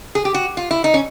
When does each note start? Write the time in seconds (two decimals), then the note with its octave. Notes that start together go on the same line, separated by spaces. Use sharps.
0.15 G#4
0.25 G4
0.34 F#4
0.57 F4
0.71 E4
0.84 D#4
0.94 C#4